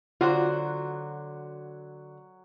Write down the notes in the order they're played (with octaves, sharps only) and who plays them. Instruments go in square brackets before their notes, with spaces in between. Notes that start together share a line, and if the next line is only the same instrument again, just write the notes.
[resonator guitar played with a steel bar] D3 F#4 C5 [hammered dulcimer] F#3 [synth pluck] F4